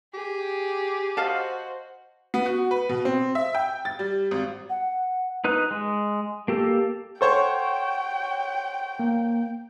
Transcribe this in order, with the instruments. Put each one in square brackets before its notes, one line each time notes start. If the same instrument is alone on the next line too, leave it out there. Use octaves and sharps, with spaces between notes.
[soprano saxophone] G4 [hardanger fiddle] G#4
[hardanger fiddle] F#4 C5 [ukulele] D#5 F5 A5
[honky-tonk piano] B3
F#4
B4
B2
C4
E5
G5
A6
G3
G#1
[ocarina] F#5
[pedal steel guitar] D#4 B4 F#6
G#3
A#3 G4 A4
[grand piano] A4 C5 C#5 [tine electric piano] F#5 C#6 [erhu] G5
[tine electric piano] A#3